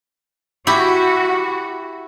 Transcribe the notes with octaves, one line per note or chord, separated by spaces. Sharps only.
E4 F#4 G4